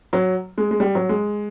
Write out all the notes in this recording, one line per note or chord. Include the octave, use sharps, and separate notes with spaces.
F#3
G#3
G#3
G3
F#3
G#3